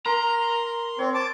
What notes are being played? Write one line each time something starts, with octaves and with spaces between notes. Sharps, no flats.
A#4 A#5 C6
C4 C#5
A5 D6